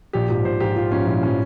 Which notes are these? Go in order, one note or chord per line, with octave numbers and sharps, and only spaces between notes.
A#1 G4
G#2 F3 G4
A#1 C5
G#2 F3 G4
A#1 F4
G#2 F3 C#4
A#1 E4
F3 C#4